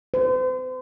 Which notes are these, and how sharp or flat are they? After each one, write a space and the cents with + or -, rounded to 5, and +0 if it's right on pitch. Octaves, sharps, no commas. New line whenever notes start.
C5 -40